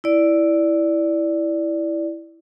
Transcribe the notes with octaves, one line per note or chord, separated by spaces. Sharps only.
E4 D5